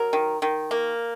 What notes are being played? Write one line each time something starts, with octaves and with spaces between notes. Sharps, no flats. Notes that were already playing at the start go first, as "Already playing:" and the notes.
Already playing: F#3 A#4
D#3
D#3
A#3